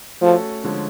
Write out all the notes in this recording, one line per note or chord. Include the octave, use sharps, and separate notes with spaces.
F3 A3 C#4 F#4 A4
D3 F3 G#3 C#4